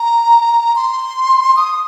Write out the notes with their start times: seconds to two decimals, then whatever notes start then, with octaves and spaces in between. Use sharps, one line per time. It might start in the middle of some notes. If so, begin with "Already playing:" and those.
Already playing: A#5
0.76 C6
1.57 D#6